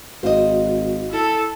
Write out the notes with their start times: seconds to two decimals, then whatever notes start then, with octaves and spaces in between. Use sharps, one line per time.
0.23 G#1 F#4 C5 D#5 F5
1.08 E4 A4